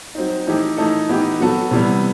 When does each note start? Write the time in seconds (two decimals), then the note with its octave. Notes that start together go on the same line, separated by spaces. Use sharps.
0.15 F#3 C4 D#4
0.47 E3 A3 D#4 G4
0.77 E3 A3 D#4 A4
1.09 E3 B3 D#4 G4
1.40 F#3 B3 F#4 A4
1.71 C3 E3 G3 B3